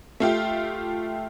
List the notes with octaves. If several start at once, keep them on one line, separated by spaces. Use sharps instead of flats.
A3 F4 G4